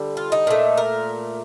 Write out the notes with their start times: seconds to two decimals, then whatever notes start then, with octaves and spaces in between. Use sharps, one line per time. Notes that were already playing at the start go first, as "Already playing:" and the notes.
Already playing: D3 G3
0.17 F4
0.32 D#4
0.47 A#2 A3
0.77 A#4